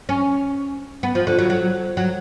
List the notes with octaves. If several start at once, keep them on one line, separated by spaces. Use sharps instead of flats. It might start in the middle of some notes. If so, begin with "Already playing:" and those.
C#4
B3
F3
D3
F#3
F#3
F#3